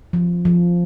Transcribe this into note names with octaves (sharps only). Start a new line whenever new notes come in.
F3
F3